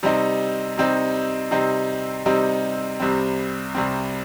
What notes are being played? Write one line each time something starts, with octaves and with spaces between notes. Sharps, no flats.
C3 G3 C4 D#4
C3 G3 C4 D#4
C3 G3 C4 D#4
C3 G3 C4 D#4
C2 C3 G3 C4
C2 C3 G3 C4